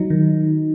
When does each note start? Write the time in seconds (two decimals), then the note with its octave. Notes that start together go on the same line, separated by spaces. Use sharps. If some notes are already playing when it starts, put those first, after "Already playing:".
Already playing: F#3 D#4
0.10 D#3